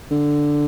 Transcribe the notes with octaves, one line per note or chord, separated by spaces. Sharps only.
D3